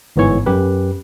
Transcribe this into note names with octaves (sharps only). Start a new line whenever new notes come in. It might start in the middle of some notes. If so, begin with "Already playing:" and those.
G1 G#2 E3 B3 C#5 C#6
F#2 G4 B4